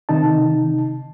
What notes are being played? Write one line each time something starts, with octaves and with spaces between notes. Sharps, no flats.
C3 D#3 D#4 A5